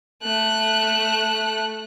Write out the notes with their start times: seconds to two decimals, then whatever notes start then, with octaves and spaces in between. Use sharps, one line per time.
0.23 A3 F#6